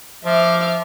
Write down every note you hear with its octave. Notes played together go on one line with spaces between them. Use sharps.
F3 E5 D6 F6